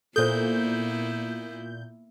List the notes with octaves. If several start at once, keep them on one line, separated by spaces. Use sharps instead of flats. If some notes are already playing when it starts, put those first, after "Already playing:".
A#2 A#3 B3 E4 A4 C5 G6